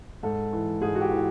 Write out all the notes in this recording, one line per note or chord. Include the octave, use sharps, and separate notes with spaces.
G#2 A4
E3
G#2 G#4
F#4
G4
E3